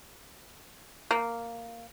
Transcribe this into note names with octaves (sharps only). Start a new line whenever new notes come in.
A#3